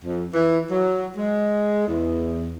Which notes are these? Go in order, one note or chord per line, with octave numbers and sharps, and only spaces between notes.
F2
E3
F#3
G#3
E2